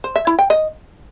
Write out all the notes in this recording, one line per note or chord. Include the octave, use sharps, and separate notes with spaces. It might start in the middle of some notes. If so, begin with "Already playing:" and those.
C5
E5
E4
G5
D#5